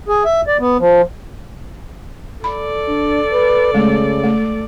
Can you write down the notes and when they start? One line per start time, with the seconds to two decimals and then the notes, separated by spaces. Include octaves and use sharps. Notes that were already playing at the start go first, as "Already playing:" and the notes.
0.08 G#4
0.25 E5
0.47 D5
0.60 B3
0.80 F3
2.44 A4 D5 B5
2.88 D4
3.33 B4
3.74 C#3 G#3 A3
4.24 A3